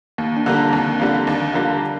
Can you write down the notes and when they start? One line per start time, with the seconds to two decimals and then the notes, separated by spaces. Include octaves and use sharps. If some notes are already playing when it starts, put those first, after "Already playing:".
0.18 D#2 A#3
0.37 D4
0.46 D3 G3 A#3 F4
0.54 D4
0.73 D#2 C4
1.00 D3 G3 A#3 F4
1.27 D#2 D4
1.54 D3 G3 A#3 D4 F4